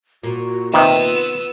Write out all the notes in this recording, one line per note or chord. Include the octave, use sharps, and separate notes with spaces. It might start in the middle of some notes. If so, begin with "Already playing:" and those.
A#2 F#4
C3 D#3 B3 F4 E6